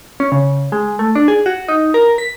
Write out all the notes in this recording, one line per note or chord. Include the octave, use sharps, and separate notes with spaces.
C#4
C#3
G#3
A3
D4
G#4
F#4
D#4
A#4
B6